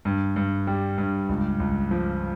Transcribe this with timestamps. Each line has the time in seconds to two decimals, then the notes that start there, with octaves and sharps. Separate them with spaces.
0.05 G2
0.36 G2
0.67 G3
0.98 G2
1.29 C#2
1.60 C#2
1.91 F3